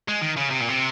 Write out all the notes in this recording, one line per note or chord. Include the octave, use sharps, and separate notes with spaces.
G#3
D#3
C#3
C3
A#2
C3